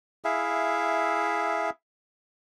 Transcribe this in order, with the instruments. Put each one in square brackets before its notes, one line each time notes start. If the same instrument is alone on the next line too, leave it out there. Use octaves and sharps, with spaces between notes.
[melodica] E4 G#4 E5 F5